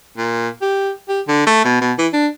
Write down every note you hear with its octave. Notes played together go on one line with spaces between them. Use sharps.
A#2
G4
G4
D3
A3
B2
B2
E3
D4